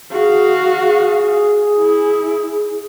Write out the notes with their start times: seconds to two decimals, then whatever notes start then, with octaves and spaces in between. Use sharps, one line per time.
0.11 F#4 G#4 F5
0.79 G#4
1.77 E4